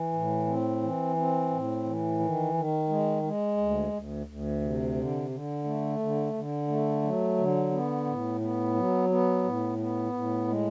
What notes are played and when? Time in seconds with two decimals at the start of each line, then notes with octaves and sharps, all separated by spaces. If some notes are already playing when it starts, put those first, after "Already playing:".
Already playing: E3
0.13 A2
0.47 C4
0.82 E3
1.16 C4
1.50 A2
1.85 E3
2.19 D#3
2.54 D#3
2.89 G#3
3.23 G#3
3.57 D2
3.92 D2
4.26 D2
4.61 C3
4.96 D3
5.30 D3
5.64 A3
5.99 D3
6.33 D3
6.68 A3
7.02 F#3
7.37 D3
7.71 B3
8.06 A2
8.41 B3
8.74 F#3
9.09 B3
9.44 A2
9.78 B3
10.13 A2
10.47 G#3